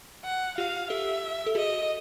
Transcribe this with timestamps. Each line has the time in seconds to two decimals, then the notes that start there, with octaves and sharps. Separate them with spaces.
0.25 F#5
0.58 F4 G4 F5
0.90 G4 A4 E5
1.47 A4
1.55 F#4 G#4 D#5